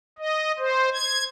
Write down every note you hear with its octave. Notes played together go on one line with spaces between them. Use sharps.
D#5
C5
G#6